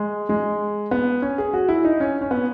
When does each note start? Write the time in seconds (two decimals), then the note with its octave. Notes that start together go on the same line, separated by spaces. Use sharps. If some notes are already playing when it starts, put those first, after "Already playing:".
Already playing: G#3
0.29 G#3
0.91 B3
1.22 C#4
1.38 G#4
1.53 F#4
1.69 E4
1.85 D#4
2.00 C#4
2.21 C#4
2.31 B3